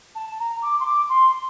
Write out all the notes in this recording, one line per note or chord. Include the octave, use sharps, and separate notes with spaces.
A5
A#5
D6
C6
D6
C6